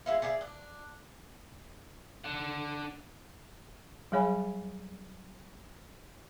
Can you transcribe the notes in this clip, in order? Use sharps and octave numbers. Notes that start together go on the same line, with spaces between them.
G#3 E4 F4
G#4 D5 E5 F5
D4
D4 F#5
F#3 G3 G#4 C#5 G#5 B5